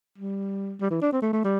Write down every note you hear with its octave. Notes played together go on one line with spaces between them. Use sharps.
G3
G3
E3
D4
C4
A3
A3
G3